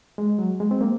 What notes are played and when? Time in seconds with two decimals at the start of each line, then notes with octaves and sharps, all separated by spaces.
0.18 G#3
0.39 F#3
0.60 G#3
0.71 C4
0.81 A#3